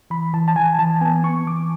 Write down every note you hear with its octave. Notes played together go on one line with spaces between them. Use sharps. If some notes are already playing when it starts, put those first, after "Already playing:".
E3 B5
E3 A5
A5
E3 G#5
E3 A5
B3 G#5
B3 C#6
E3 D6